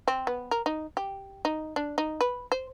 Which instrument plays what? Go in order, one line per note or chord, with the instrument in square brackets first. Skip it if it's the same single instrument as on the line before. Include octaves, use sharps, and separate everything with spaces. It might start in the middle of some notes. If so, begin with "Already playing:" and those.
[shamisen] C4
B3
A#4
D#4
G4
D#4
D4
D#4
B4
C5